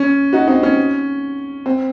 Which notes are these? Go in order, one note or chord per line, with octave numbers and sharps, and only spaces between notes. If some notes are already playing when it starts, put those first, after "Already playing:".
Already playing: C#4
D#4 F#4
C4 D#4
C#4
C4